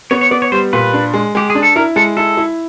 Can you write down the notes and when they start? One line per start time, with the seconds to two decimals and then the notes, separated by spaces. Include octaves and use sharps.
0.11 B3 C#5
0.21 C#5
0.31 B3 D5
0.42 C#5
0.52 G3 C5
0.73 A#2 B4
0.94 D4
1.14 G#3
1.35 G#3 G4
1.50 G#4
1.55 D4
1.63 A4
1.76 E4 A#4
1.96 G#3 A4
2.17 E4 A4
2.37 E4